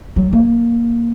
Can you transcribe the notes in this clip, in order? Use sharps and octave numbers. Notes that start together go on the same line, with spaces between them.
F#3
A#3